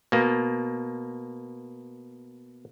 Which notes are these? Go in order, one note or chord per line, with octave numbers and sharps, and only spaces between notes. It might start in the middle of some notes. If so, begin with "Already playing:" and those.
B2 A#3